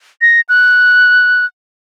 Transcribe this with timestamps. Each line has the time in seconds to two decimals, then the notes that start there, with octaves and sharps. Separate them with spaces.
0.22 A#6
0.49 F#6